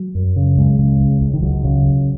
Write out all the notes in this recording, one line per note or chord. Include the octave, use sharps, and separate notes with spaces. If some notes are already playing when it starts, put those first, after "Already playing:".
Already playing: F#3
F#2
C#3
C#2 G#3
C#3
C#2
C#2
D#3
C#2 F#3
C#3
C#2